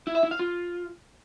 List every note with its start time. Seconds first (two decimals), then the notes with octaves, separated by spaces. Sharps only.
0.07 E4
0.15 E5
0.23 E4
0.31 F5
0.39 F4